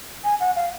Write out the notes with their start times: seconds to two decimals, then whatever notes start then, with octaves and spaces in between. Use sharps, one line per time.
0.24 G#5
0.40 F#5
0.56 F5